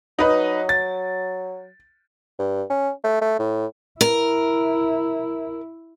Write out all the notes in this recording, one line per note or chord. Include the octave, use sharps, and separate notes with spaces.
F#3 D#4 B4 D#5
A6
G2
C#4
A3
A3
A2
E4 A#4